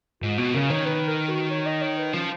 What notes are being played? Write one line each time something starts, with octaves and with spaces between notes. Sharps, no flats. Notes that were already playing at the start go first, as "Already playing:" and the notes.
G#2 F4
B2 F#4
C#3 A#4
D#3 C#5
B4
A#4
F#4
C#5
D#5
C#5
B4
F3 C#4